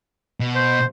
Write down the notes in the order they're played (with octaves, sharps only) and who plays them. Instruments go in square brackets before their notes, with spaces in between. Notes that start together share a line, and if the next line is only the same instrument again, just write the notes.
[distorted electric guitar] B2
[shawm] C5